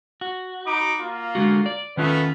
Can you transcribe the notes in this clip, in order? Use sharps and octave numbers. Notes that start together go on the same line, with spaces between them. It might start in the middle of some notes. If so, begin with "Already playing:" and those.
F#4
D#4 B5 D6
A#3 F4
D3 G#3 F#4
D5
D#3 A3 B3 C#4 F4 B4